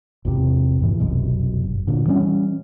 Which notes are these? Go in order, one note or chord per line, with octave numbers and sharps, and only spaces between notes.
G#1 E2 C3
G2 A#2 E3
F1 C2 F#2 B2
G1
A#2 D3
E3 G3 A3 C#4